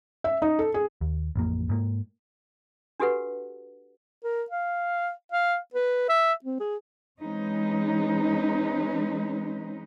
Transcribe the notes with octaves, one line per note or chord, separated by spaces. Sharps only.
E5
D#4
A4
G#4
D#2
A1 F2 A#3
G#2 A#3
D4 F#4 G4 A4 B4 F#5
A#4
F5
F5
B4
E5
C4
G#4
E3 G#3 C4 C#4 D#4 B4